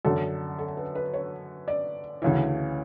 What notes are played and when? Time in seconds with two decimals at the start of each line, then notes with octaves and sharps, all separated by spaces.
0.05 F#2 D3 A4
0.59 A4
0.77 B4
0.95 B4
1.14 C#5
1.68 D5
2.22 D2 C#3 E3